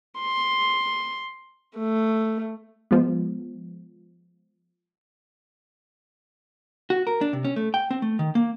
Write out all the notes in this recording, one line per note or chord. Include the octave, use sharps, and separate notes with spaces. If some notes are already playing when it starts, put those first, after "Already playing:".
C6
A3
F3 G#3 B3
F#4
A#4
D4
C3
C#4
A3
G5
C4
A3
D#3
A#3